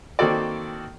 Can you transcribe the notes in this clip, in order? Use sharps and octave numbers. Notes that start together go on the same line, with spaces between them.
D#3 A#3 C4 F#4 A4 D5